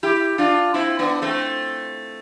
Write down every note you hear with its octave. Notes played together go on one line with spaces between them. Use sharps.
E4 G4
D4 F4
C4 E4
B3 D4
A3 C4